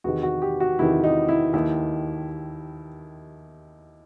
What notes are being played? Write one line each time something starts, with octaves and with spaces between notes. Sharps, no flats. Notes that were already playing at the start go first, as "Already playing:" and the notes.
E2 C3 D#3 F#4
F#4
G4
F#4
E2 C3 D#3 E4
D#4
E4
D#2 D#3 E4